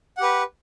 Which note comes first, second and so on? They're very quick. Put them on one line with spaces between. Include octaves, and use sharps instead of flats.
F#5 G4 B4